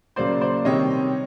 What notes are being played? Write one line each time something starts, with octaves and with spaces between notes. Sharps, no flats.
C#3 F#3 A#3 C5 D5
C5 D5
C3 D#3 G3 C4 C#5 D#5